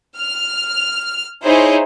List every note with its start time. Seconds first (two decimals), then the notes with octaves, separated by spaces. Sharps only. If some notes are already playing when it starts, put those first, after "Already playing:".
0.18 F6
1.43 D#4 E4 G#4 C5 C#5